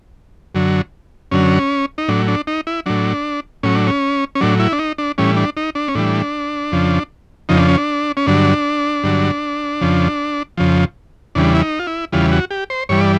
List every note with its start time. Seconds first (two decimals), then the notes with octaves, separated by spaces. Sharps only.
0.55 F#2 D3 F#3
1.32 F#2 D3 F#3 C#4
1.98 D#4
2.09 A2 F#3 D4
2.28 D4
2.47 D#4
2.67 E4
2.86 A2 F#3 D4
3.63 A2 F#3 C#4
3.75 D4
3.87 C#4
4.35 C#4
4.41 A2 F#3 D4
4.60 E4
4.72 D4
4.79 D#4
4.98 D4
5.18 A2 E3 G3 C#4
5.37 D4
5.57 D#4
5.75 D4
5.88 C#4
5.95 A2 E3 G3 D4
6.72 F2 C#3 F3
7.49 F2 C#3 F3 D#4
7.58 D4
7.68 C#4
7.78 D4
8.17 C#4
8.26 G2 D3 F#3 D4
9.04 G2 D3 F#3
9.81 F2 C#3 F3
10.58 F2 C#3 F3
11.35 E2 C#3 E3 G3 D4
11.55 E4
11.61 D#4
11.79 F4
11.87 E4
12.12 E2 C#3 E3 G3 F4
12.32 F#4
12.51 G4
12.70 C5
12.89 G2 E3 G3 C#5
13.01 D5